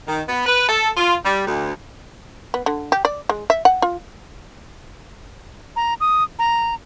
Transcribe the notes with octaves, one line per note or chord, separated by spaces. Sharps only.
D#3
B3
B4
A4
F4
G3
D2
B3
D3
G4
D5
G#3
E5
F#5
F4
A#5
D#6
A#5